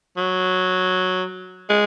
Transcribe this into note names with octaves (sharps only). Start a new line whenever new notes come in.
F#3
G#3